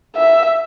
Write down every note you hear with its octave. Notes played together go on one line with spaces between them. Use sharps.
E5